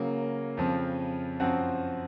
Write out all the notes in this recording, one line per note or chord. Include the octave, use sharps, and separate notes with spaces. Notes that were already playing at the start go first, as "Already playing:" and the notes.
Already playing: C#3 F#3 A#3
F2 C#3 F3
F#2 F3 C4 F#4